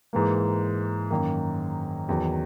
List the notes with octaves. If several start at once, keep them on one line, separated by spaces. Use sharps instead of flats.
G#2 E3 A#3
F#2 D#3 A#3
E2 D#3 F#3